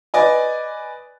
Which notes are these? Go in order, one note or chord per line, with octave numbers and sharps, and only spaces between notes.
B4 D5 D#5 G#5